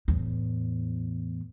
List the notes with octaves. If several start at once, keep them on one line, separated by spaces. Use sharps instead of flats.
E2 A2